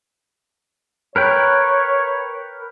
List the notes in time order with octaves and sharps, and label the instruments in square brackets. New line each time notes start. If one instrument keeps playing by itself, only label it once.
[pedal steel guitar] A#4 B4 G5 [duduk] C#5